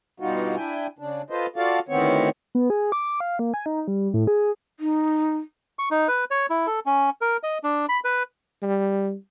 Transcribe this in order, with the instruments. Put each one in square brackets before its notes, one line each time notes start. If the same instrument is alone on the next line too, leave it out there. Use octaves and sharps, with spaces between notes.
[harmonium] G2 B2 G3 D#4 F4 F#4
D4 E4 G5 G#5
C#3 D4
F4 A4 B4 C5 D#5
F4 F#4 A4 D5 F5
D2 A2 D#3 B3 C4 C#5
[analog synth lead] B3
G#4
D6
F5
A#3
G#5
D#4
G3
A2
G#4
[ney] D#4
[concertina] C#6
D#4
B4
C#5
E4
A4
C#4
A#4
D#5
D4
B5
B4
[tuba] G3